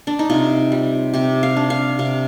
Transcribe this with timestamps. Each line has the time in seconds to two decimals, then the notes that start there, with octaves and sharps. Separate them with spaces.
0.07 D4
0.19 D#4
0.30 C3 F4
0.72 G3
1.13 C3 G4
1.43 F5
1.57 D4
1.70 F5
1.99 C3 F5